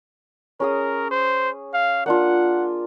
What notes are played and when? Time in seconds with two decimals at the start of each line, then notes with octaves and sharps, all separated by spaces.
0.60 C#4 G#4 A#4 D#6
1.11 C5
1.74 F5
2.06 A#3 D4 F4 F#5